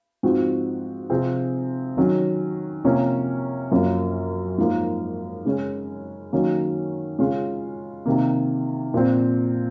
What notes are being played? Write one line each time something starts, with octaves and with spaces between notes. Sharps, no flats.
G#2 F3 C4 F#4
C3 F3 C4 F4 G#4
D#3 F#3 C#4
C3 F3 A#3 C#4
F#2 F3 A#3 C#4
G#2 F3 A#3
C#3 G#3 C#4
D#3 F#3 A#3 C#4
C#3 G#3 C#4 F4
C3 D#3 A#3
A#2 F3 C4